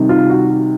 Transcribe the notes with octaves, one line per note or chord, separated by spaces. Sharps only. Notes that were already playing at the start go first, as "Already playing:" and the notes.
Already playing: C3 D#3 G3
F4
F#4